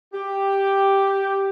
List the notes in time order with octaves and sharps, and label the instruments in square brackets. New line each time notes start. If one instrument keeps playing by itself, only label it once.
[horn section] G4